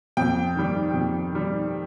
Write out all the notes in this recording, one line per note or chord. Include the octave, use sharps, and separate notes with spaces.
F2 G5
D#3 G3
F2
D#3 G3